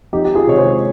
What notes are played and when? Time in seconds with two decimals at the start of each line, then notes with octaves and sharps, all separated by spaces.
0.13 F2 D#4 G4
0.25 G4
0.35 F4 G#4
0.47 C3 D#3 G#3 C#5
0.58 G#4 C5